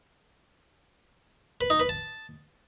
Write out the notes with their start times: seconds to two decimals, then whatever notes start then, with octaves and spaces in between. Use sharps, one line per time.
1.61 B4
1.70 D#4
1.80 B4
1.89 A5